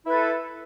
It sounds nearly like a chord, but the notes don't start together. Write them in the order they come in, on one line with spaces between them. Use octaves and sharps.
E4 B4 A4